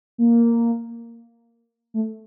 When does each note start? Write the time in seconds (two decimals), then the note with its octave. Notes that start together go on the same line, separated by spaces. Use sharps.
0.18 A#3
1.94 A3